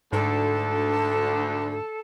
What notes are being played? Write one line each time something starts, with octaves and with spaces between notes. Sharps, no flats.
D2 G#2 D3 A4